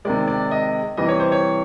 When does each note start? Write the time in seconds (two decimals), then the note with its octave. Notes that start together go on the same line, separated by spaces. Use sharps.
0.05 C3 D#3 G#3 D5
0.28 D5
0.51 D#5
0.97 C3 E3 G3 D#5
1.08 C#5
1.20 C5
1.32 C#5